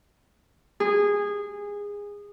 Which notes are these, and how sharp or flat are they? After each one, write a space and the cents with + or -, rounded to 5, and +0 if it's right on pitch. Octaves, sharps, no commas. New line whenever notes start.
G#4 -20